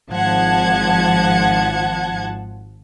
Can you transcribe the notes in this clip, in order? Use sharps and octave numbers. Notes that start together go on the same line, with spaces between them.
G#1 F3 F#5 A5 G#6